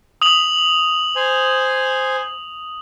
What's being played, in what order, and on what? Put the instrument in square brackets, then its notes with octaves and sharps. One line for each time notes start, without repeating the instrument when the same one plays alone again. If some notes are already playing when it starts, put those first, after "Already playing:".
[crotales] D#6 F7 F#7
[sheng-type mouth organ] C5 G#5